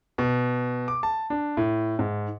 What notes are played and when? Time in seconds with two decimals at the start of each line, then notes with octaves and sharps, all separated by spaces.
0.18 B2
0.88 D6
1.03 A5
1.30 D4
1.57 A2
1.99 G#2